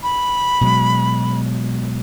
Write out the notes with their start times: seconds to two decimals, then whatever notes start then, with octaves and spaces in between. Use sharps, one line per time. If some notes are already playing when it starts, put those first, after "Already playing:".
0.03 B5
0.61 B2 F#3 G#3